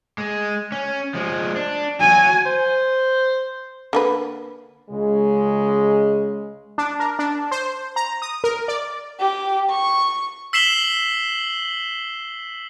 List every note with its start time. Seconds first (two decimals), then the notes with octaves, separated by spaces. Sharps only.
0.18 G#3
0.72 C#4
1.14 F3 G#3
1.56 D4
2.00 F#3 F#4 G#5
2.46 C5
3.93 D3 A#3 B4
4.90 C#2 C#3 G#3
6.78 D4
7.00 A#4
7.19 D4
7.52 C5
7.96 A#5
8.22 D#6
8.44 A#4
8.68 D5
9.20 G4
9.70 C#6
10.53 E6 B6 C7 E7 F#7 G7